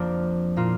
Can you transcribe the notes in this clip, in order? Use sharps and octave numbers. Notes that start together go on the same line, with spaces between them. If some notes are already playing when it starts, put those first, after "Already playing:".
Already playing: F2 F3 A#3 D4
A#2 A#3 F4